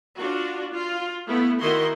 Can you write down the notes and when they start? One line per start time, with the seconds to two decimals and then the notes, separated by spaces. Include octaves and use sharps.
0.18 D4 F4 F#4
0.71 F4
1.27 A3 B3 E4
1.60 D#3 E4 F#4 D#5 C6